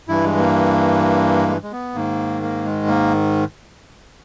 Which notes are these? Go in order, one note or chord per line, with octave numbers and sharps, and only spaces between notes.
G2 E3 E4
G#3
A#3
G#3
G#3
B3
G#2 D#3 A#3
A#3
G#3
A#3